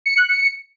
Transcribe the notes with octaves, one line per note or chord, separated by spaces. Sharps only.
C#7
F#6
C#7